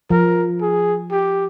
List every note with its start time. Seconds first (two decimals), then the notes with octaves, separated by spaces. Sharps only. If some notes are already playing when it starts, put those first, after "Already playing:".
0.10 F3 A#4
0.61 G#4
1.11 G4